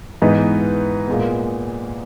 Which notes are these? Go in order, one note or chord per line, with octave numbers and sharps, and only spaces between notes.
G#2 E3 B3 D#4
A#2 G#3 B3